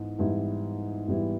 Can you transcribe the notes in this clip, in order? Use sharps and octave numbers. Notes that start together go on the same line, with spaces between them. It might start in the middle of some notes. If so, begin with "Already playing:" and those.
Already playing: G#2 E3 B3
G#2 E3 G3 B3 E4
G#2 E3 G3 B3 E4